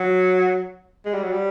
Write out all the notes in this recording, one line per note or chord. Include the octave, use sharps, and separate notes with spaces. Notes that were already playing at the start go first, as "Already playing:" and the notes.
Already playing: F#3
G#3
G3
F#3
G3